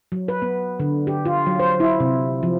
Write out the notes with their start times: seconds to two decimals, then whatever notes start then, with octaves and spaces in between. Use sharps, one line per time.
0.12 F#3
0.28 B4
0.42 B3
0.80 D3
1.07 G4
1.25 F4
1.46 F#3
1.60 C5
1.80 E4
2.00 C3
2.43 F3